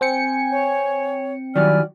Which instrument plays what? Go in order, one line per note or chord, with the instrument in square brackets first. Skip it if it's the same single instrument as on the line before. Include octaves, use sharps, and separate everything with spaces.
[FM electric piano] C4 G5 C#7 [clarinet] G#5
[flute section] C#5
[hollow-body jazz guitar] D#3 F#3 G3 [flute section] E4 G#5 F6 [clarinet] D5